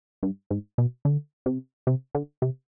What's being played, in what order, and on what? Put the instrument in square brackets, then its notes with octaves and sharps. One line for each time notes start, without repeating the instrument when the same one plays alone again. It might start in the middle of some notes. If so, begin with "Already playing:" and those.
[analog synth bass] G2
G#2
B2
D3
C3
C3
D3
C3